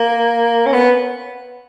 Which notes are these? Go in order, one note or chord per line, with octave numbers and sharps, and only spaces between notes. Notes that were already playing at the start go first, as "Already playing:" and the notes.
Already playing: A#3
C#4
B3